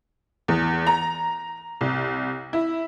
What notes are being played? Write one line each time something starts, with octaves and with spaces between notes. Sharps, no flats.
E2
A#5
C2
E4